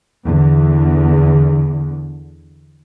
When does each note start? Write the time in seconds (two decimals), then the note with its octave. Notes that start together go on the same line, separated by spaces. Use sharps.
0.25 E2 D3